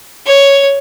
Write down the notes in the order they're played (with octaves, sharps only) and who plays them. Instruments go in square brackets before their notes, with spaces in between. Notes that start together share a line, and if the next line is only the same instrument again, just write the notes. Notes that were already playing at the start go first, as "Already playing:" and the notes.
[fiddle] C#5